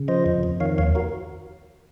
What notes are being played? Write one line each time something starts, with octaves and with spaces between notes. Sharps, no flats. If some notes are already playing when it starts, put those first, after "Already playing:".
Already playing: C#3
F3 C5 D#5
F2
F2
D#3 C#5 F5
D#2 C#5 F5
F#4 A#4